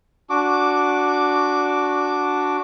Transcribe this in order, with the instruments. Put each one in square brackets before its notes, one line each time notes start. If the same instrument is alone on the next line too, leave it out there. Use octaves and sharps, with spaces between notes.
[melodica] D4 F#4 D6